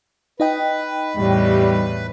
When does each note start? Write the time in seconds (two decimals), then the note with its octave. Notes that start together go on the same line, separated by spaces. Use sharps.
0.40 D#4 B4 D#5 G5
1.17 E2 A2 G3